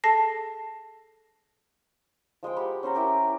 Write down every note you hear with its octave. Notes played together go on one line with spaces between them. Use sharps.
G#4 A4 A5 A#6 C7
F3 G#3 C5 G5
G4 F#5 B5
C#4 C5 F#5 A#5
E4 G4 A#4